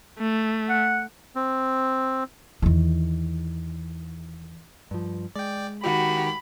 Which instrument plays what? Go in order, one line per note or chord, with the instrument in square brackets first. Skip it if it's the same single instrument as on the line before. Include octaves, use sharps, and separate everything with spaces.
[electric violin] A3
[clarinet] F#5
[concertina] C4
[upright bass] E2 D#3
[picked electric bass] G2 F3
[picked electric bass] G#3 [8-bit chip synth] D5 G5
[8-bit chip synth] D#3 G4 [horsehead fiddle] F#4 [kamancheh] B5